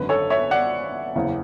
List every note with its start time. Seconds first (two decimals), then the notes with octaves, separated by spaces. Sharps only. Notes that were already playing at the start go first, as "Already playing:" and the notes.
Already playing: G#1 F#2 D3 B4
0.09 A4 C#5
0.30 C#5 E5
0.51 D5 F#5
1.15 F#1 E2 C#3 E3